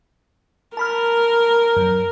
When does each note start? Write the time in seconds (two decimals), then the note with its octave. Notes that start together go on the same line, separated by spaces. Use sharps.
0.77 A#4 A5 B5 F6
1.77 F#2